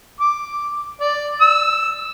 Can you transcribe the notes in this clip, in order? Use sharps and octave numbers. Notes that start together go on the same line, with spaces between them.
D6
D5
E6